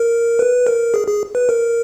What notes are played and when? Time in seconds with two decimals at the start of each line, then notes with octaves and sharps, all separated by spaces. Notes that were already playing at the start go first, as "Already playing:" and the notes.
Already playing: A#4
0.39 B4
0.67 A#4
0.94 G#4
1.08 G#4
1.35 B4
1.49 A#4